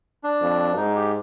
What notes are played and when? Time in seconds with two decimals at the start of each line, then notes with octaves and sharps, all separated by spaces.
0.24 D4
0.42 F2
0.77 G#2 D#4
0.96 G4